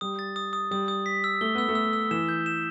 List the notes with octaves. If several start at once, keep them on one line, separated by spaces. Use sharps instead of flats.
G3 D#6
A6
D#6
D#6
G3 D#6
D#6
B6
E6
A3 G7
B3 E6
A3
E6
E6
E3 E7
G6
E7